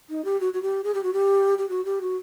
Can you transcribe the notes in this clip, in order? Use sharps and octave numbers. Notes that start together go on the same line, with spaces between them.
D#4
G4
F#4
F#4
G4
G#4
G4
F#4
G4
G4
F#4
G4
F#4